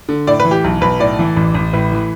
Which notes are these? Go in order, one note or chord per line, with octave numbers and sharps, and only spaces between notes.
D3
A2 D5
B4
E3
G4
B1
B1 B4
A2 D5
E3
A1
A1
A2 B4
E3